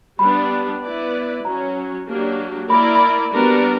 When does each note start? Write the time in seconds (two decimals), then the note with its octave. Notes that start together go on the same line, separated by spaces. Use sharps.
0.19 G3 B3 D4 B5
0.82 B3 E4 B4 D5
1.44 F#3 C#4 F#4 C#5 A#5
2.06 F#3 A#3 D4 G4
2.69 A#3 E4 A#4 D5 B5
2.95 B5
3.32 G3 B3 D4 F#4 A#4